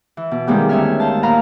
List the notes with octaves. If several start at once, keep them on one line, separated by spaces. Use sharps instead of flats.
E3
B2
D#3 F3 G3 G#3 B3 G4
D2 D#3 C#4 C#5 E5 F6
C5 F5 A5
A#2 F5 F#5 A#5 B5